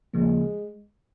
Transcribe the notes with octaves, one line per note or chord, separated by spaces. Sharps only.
D#2 C#3 F3 G#3 A#3